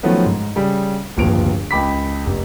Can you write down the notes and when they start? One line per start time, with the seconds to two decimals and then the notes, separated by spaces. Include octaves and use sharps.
0.03 D#3 F3 F#3 A3 B3 C#4
0.26 G#2
0.56 C#3 G3
1.17 D1 G1 D#2 F3 D7 F7
1.71 C#2 G5 B5 D6 B6
2.26 F1